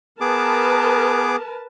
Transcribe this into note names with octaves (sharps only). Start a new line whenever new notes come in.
B3 G#4 A#4 B4 A5 D6